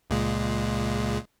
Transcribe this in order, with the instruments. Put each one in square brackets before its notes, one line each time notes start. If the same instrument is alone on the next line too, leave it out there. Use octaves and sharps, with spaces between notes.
[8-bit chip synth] C#2 A#2 G#3